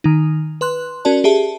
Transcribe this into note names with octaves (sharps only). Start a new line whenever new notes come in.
D#3 D#4
B4 C6 F#6
C#4 F#4 A#4 D5 A5
G4 G#4 E5 A5